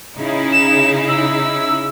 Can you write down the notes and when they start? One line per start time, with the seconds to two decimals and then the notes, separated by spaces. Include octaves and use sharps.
0.18 C#3 D#4 E4
0.52 E7
1.08 E6